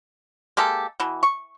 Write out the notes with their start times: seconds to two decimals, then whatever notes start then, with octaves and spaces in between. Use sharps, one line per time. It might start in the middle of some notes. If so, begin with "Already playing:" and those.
0.57 G#3 A#3 G4 A4
1.00 B2 E3
1.23 C#6